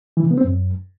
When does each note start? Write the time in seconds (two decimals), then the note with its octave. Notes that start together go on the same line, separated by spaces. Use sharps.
0.17 E3
0.24 C#3
0.31 B3
0.38 C4
0.44 F#2